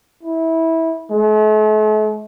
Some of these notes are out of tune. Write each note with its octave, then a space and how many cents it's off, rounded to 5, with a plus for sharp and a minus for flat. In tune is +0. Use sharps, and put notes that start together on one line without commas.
E4 -20
A3 -45